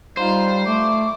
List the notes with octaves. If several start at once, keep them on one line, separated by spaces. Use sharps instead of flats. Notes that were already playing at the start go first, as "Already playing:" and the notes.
G3 D#4 F4 C5
A3 D6